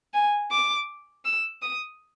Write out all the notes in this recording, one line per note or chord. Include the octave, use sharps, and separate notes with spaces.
G#5
D6
E6
D#6